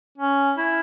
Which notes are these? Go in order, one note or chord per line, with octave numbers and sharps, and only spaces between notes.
C#4
E4